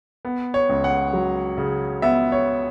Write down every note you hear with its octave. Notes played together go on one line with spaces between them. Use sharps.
B3
C#5
C#2
F#5
F#3
C#3
B3 E5
C#5